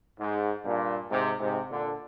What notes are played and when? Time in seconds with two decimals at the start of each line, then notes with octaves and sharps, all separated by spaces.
0.19 G#2
0.65 G2 A#2
1.09 G#2 C3
1.40 G#2 C3
1.70 A#2 D3